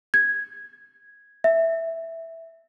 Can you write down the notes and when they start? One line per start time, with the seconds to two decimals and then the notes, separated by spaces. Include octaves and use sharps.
0.14 G#6
1.44 E5